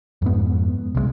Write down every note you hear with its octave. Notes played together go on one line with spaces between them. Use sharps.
F2 G#2 B3
C2 E3 G#3